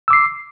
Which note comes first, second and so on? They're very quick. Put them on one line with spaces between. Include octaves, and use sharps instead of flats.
E6 D6 C7